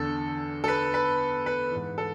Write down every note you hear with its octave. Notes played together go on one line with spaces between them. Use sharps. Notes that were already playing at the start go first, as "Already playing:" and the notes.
Already playing: E2 D3 A4
A4
B4
B4
B4
G#2 E3
A4